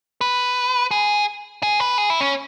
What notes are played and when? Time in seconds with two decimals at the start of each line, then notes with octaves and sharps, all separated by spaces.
0.21 B4
0.91 G#4
1.63 G#4
1.80 B4
1.98 G#4
2.10 E4
2.21 C#4